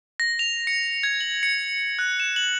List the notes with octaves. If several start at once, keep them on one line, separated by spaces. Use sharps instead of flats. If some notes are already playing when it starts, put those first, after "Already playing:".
A#6
F7
C#7
G#6
F#7
C#7
F#6
E7
F#7